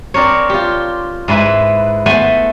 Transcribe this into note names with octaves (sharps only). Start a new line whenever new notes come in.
C4 D4 A#4 C#5
F4 G4
G#2 G#3 E4 B4
A3 B3 C5 F#5 G#5